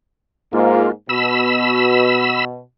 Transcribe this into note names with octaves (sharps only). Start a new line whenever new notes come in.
G#2 A#3 F4
B2 B5 E6